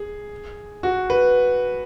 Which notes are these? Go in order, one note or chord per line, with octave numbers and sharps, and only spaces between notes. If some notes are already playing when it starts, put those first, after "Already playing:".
Already playing: G#4
F#4
B4